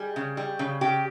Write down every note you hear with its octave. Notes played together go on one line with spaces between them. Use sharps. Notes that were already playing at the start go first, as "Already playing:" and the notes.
Already playing: G3 G#4
C#3
G3
C#3
C#3 G4